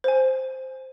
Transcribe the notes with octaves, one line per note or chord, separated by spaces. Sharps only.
C5 G#5